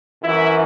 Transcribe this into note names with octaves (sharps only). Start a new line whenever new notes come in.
F#2 E3 E4